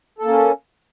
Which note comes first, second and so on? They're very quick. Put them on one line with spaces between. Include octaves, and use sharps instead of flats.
A4 A#3 C#4